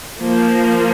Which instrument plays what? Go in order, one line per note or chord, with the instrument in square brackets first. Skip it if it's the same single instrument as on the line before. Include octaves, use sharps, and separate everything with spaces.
[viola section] F3 A#3